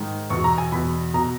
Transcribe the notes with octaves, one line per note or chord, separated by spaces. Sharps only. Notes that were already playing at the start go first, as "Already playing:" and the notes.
Already playing: G#2 D#3
E2 B2 C#6
A#5
G#5
E2 B2 B5
B2 A#5